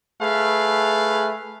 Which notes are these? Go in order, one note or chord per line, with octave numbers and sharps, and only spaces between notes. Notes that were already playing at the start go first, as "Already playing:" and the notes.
A3 G#4 B4 F5